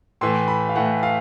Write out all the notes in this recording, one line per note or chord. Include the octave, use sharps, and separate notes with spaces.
A2 E3 A3 C6
B5
F5
A2 E3 A3 F#5
F5